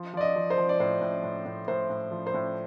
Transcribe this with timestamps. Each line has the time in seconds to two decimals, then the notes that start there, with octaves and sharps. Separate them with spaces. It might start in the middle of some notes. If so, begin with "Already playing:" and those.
Already playing: F3
0.14 F3 D5
0.21 D#5
0.36 F3
0.50 C5
0.58 F3
0.69 D5
0.80 A2 C5
1.01 A2
1.24 A2
1.46 A2
1.68 A2 C5
1.90 A2
2.11 F3
2.27 C5
2.34 A2